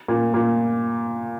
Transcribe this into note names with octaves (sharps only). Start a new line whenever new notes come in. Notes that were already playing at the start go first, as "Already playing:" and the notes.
A#2
A#2